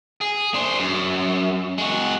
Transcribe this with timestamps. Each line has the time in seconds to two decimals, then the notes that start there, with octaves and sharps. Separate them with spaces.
0.21 G#4
0.54 D4 C5
0.79 F#2
1.78 G#3 F#4